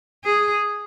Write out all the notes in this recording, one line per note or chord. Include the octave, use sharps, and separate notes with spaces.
G#4